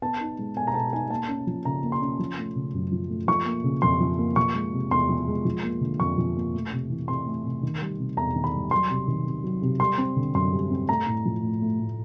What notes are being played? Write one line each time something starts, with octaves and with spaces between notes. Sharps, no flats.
B3 A5
D#4
G#3
B2 G#5
A#5
B3 A5
D#4 G#5
A#3 A5
C#4
F3
C#3 A#5
A#3
C6
C#4
F3
A3
C#3
F#2
F3
A3
F3 C#6
A#3
C#3
F2 C6
F3
A#3
F3 C#6
G#3
C3
E2 C6
F3
G#3
F3
A#3
D3
F2 C#6
F3
A#3
A3
C3
E3
C3 C6
A3
C3
D#3
G3
C3
E2 A#5
D#3
B5
G3
F#3 C6
C3
D#3
C3
F#3
C3
G3 C6
C4
D3
F#2 C6
G3
C4
A3 A#5
A2
F3
A2
A3
A2